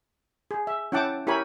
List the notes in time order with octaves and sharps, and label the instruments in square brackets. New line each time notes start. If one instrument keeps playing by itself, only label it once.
[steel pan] G#4
E5
C#4 E4 F#5 G5 A5 D6
E4 G4 A#4 C#5 G#5 B5